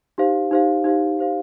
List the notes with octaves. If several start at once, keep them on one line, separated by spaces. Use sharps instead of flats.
D#4 G4 C5 F5
D#4 G4 C5 F5
D#4 G4 C5 F5
D#4 G4 C5 F5